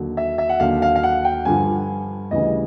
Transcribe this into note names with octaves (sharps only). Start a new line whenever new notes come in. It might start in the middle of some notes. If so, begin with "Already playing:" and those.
Already playing: D#2 D3 F#3
E5
E5
F#5
D#2 D3 F#3 F5
F5
F5
F#5
G5
G2 D3 F3 G#5
D2 C#3 E3 G3 D#5